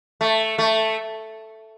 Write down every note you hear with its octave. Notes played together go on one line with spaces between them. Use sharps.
A3
A3